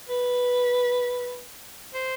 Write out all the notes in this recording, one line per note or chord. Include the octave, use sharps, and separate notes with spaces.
B4
C5